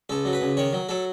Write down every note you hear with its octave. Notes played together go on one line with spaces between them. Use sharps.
C#2 A4
F#3
B4
C#2
D#3 C#5
F#3
F#3 A4